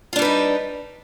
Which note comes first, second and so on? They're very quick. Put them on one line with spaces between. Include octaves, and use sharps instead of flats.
F4 D4 G3 B4 D#4